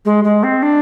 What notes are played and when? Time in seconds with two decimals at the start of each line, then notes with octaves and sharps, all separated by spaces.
0.05 G#3
0.24 G#3
0.43 C4
0.62 D4